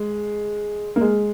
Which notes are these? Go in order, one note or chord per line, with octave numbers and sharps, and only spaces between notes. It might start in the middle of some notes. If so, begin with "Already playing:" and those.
Already playing: G#3
A#3
G#3